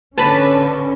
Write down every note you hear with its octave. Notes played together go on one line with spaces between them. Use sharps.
D3 C#4 B4 A5 B5